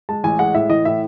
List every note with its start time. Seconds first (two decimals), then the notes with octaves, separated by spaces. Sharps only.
0.09 G#3 A5
0.24 A1 G#5
0.39 G#3 F#5
0.54 A2 E5
0.69 E3 D#5
0.85 A2 E5